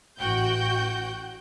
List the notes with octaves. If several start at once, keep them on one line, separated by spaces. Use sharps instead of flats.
A1 F#4 F#5 G5 G6